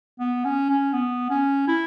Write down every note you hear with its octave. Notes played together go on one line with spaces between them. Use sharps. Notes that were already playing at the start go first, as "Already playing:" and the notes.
B3
C#4
C#4
B3
C#4
E4